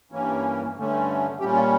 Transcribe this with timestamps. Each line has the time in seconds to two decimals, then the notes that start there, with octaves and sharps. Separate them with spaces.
0.12 G2 E3 A#3 C#4
0.76 G2 D3 A3 C#4
1.39 A#2 G3 C#4 G4
1.55 F4